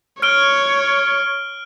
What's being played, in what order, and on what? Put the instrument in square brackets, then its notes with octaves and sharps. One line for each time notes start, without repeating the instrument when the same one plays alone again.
[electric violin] C#5 [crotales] F6 D7 G7